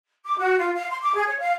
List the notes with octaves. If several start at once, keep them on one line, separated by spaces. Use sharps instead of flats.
D6
F#4
F4
F5
C6
D6
G#4
C#5
F5